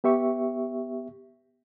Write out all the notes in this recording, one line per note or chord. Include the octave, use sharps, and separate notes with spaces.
B3 G4 E5 C#6